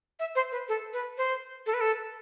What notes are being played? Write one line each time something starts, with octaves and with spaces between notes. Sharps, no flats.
E5
C5
B4
A4
B4
C5
A4
B4
A4